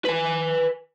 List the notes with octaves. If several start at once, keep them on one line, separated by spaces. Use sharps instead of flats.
B4 G#5